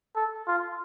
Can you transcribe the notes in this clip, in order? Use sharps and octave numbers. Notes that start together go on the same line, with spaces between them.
A4
F4